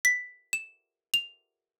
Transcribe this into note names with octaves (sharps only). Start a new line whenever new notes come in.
B6
E7
F7